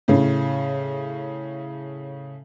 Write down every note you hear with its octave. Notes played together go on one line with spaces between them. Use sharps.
A2 C#3